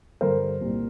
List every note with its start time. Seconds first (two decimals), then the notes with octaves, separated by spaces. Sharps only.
0.21 G2 D3 A#4 C5
0.60 C2 A#2